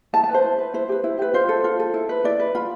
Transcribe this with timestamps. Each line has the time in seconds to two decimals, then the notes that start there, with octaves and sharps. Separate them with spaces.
0.13 E4 A5
0.24 A5
0.29 B4
0.34 C5
0.44 E4
0.58 B4
0.74 E4 C5
0.89 G4 B4
1.04 E4
1.19 G4 B4
1.34 F4 C5
1.49 A4
1.64 F4
1.79 A4
1.94 E4
2.09 B4
2.24 E4 D5
2.40 B4
2.55 F4 B5